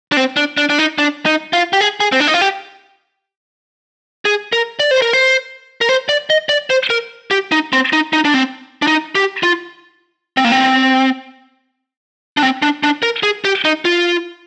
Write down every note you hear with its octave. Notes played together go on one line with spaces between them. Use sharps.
D4
C4
D4
D4
D4
D#4
D4
D#4
F4
G4
G#4
G#4
C4
D4
D#4
F4
G4
G#4
A#4
D5
C5
A#4
C5
A#4
C5
D5
D#5
D5
C5
A#4
G4
D#4
C4
D#4
D#4
D4
C4
D4
D#4
G4
F4
C4
A#3
C4
D4
C4
D4
D4
A#4
G#4
G4
D#4
F4